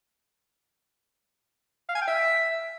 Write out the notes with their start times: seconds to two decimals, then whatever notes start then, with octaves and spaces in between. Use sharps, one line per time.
1.89 F5
1.95 G#5
2.01 G5
2.08 E5